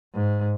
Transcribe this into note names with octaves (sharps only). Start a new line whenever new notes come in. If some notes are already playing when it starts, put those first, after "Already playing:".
G#2